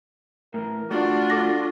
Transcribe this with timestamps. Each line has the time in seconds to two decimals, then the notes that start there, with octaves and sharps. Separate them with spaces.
0.54 A2 E3 A#4
0.91 A3 D4 F4 F#4 D5
1.30 A4 D6 A#6